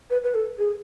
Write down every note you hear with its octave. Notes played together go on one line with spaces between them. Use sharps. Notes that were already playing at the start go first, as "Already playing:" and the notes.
B4
B4
A4
G#4